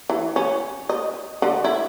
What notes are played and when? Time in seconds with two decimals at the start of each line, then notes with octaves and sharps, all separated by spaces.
0.10 E3
0.36 C#4
0.89 D#5
1.42 D3
1.64 E4